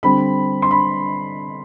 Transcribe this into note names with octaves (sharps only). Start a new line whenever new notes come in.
D3 G3 C4 B5
C6
B5